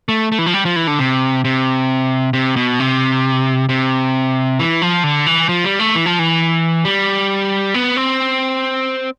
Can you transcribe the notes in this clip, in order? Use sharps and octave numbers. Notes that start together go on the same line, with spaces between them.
A3
A3
E3
F3
G3
F3
E3
D3
C3
C3
C3
B2
C3
C3
E3
F3
D3
E3
F3
G3
A3
E3
F3
E3
G3
B3
C4